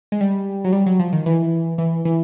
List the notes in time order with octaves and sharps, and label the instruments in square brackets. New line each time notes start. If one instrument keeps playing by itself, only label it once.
[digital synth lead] G#3
G3
F#3
G3
F#3
F3
D#3
E3
E3
E3